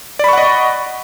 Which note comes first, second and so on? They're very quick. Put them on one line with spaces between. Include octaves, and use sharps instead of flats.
D5 B5 C#6 F#5 D#5